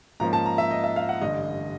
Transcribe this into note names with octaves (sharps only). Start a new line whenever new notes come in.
G#2 F3 A#3 C#4 A#5
A5
A#5
E5
D#5
E5
F5
F#5
A1 G2 D3 D#5